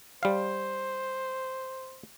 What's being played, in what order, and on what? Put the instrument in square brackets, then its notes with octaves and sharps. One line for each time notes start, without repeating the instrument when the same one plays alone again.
[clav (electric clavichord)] G3 F5 [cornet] C5